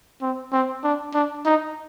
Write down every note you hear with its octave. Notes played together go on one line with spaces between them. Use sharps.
C4
C4
D4
D4
D#4